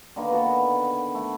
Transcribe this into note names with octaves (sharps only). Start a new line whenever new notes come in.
D3 D#3 A#3 B4
B3 F#4 A5
F#4
A3